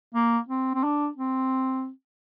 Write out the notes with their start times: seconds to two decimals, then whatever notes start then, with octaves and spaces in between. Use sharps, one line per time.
0.14 A#3
0.48 C4
0.74 C4
0.84 D4
1.17 C4